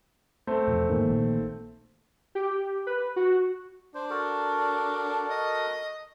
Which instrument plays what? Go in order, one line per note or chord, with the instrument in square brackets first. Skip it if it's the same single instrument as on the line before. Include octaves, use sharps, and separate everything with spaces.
[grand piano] A3 C4
[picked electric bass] E2 B2 F3
[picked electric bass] G#2 E3 G#3 [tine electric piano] D#3 A#3
[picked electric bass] A#1
[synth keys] G4
B4
F#4
[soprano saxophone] D4 [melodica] C5
[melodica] F#4 A4 A#4
[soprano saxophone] D#5